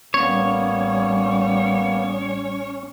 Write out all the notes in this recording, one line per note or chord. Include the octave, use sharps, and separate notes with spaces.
A1 G3 A#3 B3 C#4 C#5